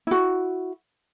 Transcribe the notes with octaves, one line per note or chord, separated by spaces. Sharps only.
E4 F#4